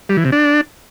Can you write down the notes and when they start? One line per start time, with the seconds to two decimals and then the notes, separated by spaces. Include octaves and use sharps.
0.09 G3
0.17 E3
0.25 C3
0.32 D4